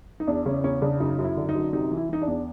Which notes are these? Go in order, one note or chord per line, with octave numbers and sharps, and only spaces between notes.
D#4
E2 D4
C#3 C#4
E2 C#4
C#3 D4
F#2 D#4
F#2
E4
D3
D#4
F#2
C3 D#4
E3
E4
E3 D#4
D4
E2